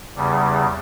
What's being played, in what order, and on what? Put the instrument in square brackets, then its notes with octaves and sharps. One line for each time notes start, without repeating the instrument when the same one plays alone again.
[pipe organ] E2 C#3 G3